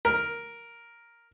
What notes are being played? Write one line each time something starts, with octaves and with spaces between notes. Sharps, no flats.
A#4